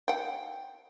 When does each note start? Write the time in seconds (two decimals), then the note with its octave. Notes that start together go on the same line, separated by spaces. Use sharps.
0.08 F#5 G5